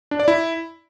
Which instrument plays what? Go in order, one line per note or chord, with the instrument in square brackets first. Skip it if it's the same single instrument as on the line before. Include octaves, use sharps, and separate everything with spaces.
[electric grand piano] D4
D5
E4